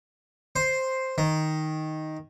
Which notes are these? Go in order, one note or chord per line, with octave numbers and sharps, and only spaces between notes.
C5
D#3